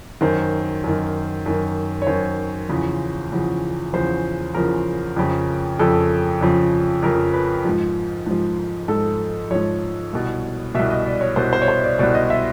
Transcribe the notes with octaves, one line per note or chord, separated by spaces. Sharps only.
F#2 D#3 C5
F#2 D#3
F#2 D#3
C#5
F#2 D#3 C5
E2 C#3 F3
E2 C#3 F3
E2 C#3 F3 C5
E2 C#3 F3 A#4
F2 C#3 F3
F2 C#3 F3 A4
F2 C#3 F3
F2 C#3 F3 A#4
B4
G#2 F3
G#2 F3
G#2 F3 A4
G#2 F3 C#5
C2 B2
C2 B2 E5
D#5
D5
C#5
C2 B2 C5
C5
C#5
C5
D5
C2 B2 D5
D#5
E5